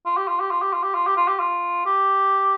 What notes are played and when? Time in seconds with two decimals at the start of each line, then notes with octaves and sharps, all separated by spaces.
0.06 F4
0.17 G4
0.28 F4
0.40 G4
0.51 F4
0.62 G4
0.73 F4
0.83 G4
0.95 F4
1.07 G4
1.17 F4
1.28 G4
1.40 F4
1.86 G4